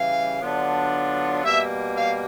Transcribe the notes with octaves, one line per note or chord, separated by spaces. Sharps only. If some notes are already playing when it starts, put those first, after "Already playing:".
Already playing: C#3 E3 G3 F5
D3 F#3 B3 D4 F4
B2 G3 A#3 E5
F5